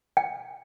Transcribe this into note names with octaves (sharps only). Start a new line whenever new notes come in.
G5